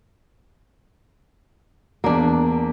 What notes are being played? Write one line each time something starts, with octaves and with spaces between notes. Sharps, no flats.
E2 A#3 D4